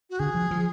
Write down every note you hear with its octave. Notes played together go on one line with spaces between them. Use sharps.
F#4
D3 G#4
F3
F3